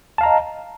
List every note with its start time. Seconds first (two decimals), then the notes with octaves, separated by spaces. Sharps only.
0.18 A5
0.21 F5
0.23 A#5
0.26 D#5